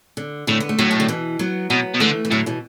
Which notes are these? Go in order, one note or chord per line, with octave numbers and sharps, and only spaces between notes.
D3
A2 D3
B3
A3
A2 D3 F#3
B2
D3
B2 E3
F#3 B3
B2 F#3 B3
B2
D3 E3 A3
E3
A2 D3 F#3
B2 E3